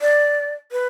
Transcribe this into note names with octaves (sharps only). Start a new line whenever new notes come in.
D5
B4